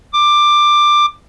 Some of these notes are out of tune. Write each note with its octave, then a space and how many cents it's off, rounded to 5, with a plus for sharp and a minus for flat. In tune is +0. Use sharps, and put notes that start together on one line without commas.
D6 +15